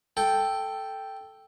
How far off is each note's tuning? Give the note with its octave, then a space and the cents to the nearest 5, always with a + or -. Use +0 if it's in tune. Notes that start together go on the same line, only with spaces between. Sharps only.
A4 +0 G5 +0